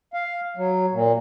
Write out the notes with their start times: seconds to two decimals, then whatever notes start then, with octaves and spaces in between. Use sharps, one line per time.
0.14 F5
0.57 F#3
0.92 A#2